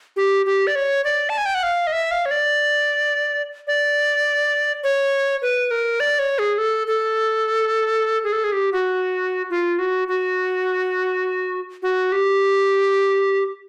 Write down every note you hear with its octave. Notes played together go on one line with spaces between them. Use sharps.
G4
G4
D5
C#5
D5
A5
G#5
G5
F#5
F5
D#5
E5
F5
C#5
D5
D5
C#5
B4
A#4
D5
C#5
G#4
A4
A4
G#4
A4
G#4
G4
F#4
F4
F#4
F#4
F#4
G4